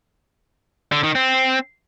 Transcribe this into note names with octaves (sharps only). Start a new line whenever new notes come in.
D3
D#3
C4